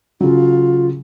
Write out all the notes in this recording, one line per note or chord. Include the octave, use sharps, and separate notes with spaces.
C#3 F#3 F4